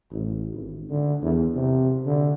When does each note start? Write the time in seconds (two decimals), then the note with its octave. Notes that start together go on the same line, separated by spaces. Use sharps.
0.11 A1
0.53 G#1
0.89 D3
1.22 E2
1.55 C3
2.05 D3